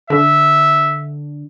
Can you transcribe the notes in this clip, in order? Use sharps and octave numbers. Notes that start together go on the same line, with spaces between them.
D3 E5